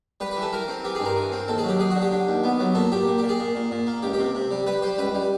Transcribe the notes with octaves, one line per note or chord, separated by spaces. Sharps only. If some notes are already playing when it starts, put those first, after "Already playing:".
G3 B4
E3 B4
A4
E3 A#4
C4
E3 G4
G2 G#4
A#4
E3
C4
D#2 A4
G#4
F#3
G4
F#3 G#4
D3 F#4
G4
D3
D#2
B3
F#3
A#2 A4
A#2 G4
A#2
A#2 G4
G#4
A#2
A#2
A#2
A#3
C#2 G4
G4
C3
C3
G3
G3 B4
G3 C5
C#2 B4
G3